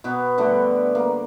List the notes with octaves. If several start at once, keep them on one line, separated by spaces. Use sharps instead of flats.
B2 B3 B4 D6
D3 G3 A3 D4
A#3